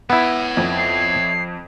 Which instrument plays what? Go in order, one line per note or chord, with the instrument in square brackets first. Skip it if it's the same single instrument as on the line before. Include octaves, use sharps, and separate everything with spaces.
[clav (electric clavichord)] B3 E4 [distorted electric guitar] C#5 E5
[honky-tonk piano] F2
[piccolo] C7